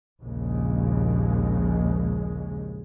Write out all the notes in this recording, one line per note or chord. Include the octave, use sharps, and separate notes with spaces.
A#1 D#2 C#3 G#3